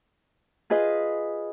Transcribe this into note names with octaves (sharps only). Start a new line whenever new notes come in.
F4 G#4 B4 D#5